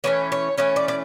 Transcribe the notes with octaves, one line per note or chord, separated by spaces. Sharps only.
E3 A3 C#4 C#5
C#5
E3 A3 C#4 C#5
D5
D5